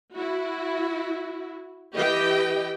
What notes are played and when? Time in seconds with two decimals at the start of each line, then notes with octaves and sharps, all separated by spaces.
0.13 E4 F#4
1.93 E3 G4 D#5 G5